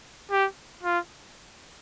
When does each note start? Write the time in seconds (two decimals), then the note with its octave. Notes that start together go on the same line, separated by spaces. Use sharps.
0.31 G4
0.83 F4